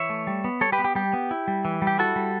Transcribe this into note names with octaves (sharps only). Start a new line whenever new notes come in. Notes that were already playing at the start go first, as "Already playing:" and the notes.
Already playing: E3 C#5 E5
A3
G3
B3
G3 A4 C#5
G4 B4
B3
G4
G3 G4
B3
E4
G3
E3
G3
G4
E4 F#4 A4
G3